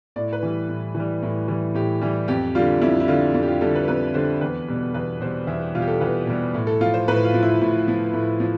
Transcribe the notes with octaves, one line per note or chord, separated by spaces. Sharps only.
A2 D5
B4
E3 G3
A2
E3
G3
A2
E3 G3
A2 G4
E3 G3
F2 G4
D3 G3 F4
F2 E4
E4
D3 G3 F4
F2
G4
F4
D3 G3 A4
B4
F2 B4
D3 G3 C5
E2 B4
B2 G3
E2 B4
B2 G3 C5
E2 E5
G4
B2 G3 F4
G4
A4
E2 B4
B2 G3
A2
A4
F3 F4
C5
A2 B4
F4
F3
E4
A2
F3
A2
F3